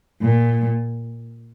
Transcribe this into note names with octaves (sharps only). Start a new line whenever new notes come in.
A#2